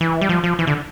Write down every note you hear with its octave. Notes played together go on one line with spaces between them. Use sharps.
E3
G3
F3
F3
E3
D3